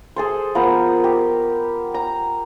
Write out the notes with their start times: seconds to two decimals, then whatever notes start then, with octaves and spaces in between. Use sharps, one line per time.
0.16 G#4 A4 C5
0.55 F3 B3 A#4 C5
1.04 G4
1.94 A#5